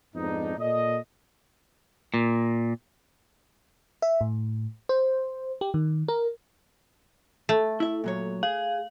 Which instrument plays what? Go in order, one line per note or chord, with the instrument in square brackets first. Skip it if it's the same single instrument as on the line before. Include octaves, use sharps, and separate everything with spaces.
[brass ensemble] F2 G#2 B3 D4 D#4
A#2 A4 D5 D#5
[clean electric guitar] A#2
[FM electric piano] E5
A2
C5
G4
D#3
A#4
[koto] A3
[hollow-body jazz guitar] E4 E5
A#2 F#3 C#5
[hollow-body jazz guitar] G#4 [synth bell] F5